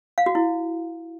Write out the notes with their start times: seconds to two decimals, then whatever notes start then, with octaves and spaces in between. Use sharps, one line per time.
0.18 F5
0.26 F#4
0.35 E4